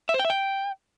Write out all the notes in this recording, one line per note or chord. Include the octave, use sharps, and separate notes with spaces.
E5
C5
G5
E5
G5